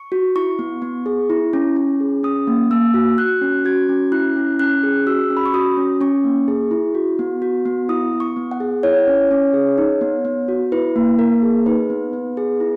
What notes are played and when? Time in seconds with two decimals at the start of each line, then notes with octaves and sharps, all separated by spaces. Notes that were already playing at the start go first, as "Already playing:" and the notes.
Already playing: C#6
0.12 F#4
0.36 E4 C#6
0.59 B3
0.82 B3
1.06 G#4
1.30 E4
1.53 C#4
1.76 C#4
2.00 G#4
2.23 C#4 D#6
2.47 A#3
2.71 A#3 E6
2.94 F#4
3.18 F#4 F#6
3.42 C#4
3.65 F#4 G#6
3.89 C#4
4.12 E4 F#6
4.36 C#4
4.59 C#4 F#6
4.83 G#4
5.06 F#4 E6
5.30 C#4
5.37 B5
5.46 C#6
5.54 F#4 D#6
5.77 C#4
6.01 C#4 C#6
6.24 A#3
6.48 G#4
6.71 E4
6.95 F#4
7.19 B3
7.42 F#4
7.66 B3
7.89 E4 D#6
8.13 B3
8.20 C#6
8.36 B3
8.51 F#5
8.60 G#4
8.83 E4 C#5
9.08 C#4
9.31 C#4
9.54 G#4
9.78 D#4
10.01 B3
10.25 B3
10.48 F#4
10.72 E4 B4
10.96 A#3
11.19 A#3 A#4
11.42 G#4
11.66 D#4 B4
11.90 B3
12.13 B3
12.37 G#4
12.60 E4